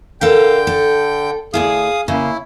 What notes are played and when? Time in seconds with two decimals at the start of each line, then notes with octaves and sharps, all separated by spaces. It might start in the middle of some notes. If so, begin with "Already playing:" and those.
0.21 D3 A4 A#4 F5 G5 G6
0.67 A4
1.54 D2 G2 E4 G#4 F5 D#6
2.08 C#3 A#3 C#4 E4